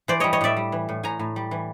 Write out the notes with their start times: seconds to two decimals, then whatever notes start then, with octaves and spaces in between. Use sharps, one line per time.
0.08 E3 C5 D5
0.20 G3 C#5 D#5
0.33 C#5 D#5
0.41 A2 D5 E5
0.57 G3
0.72 E3
0.89 A2
1.03 A2 G#5 A#5
1.19 A2
1.36 G3
1.51 E3